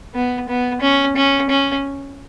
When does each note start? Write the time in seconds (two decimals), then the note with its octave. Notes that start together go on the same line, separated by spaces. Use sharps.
0.15 B3
0.48 B3
0.81 C#4
1.16 C#4
1.50 C#4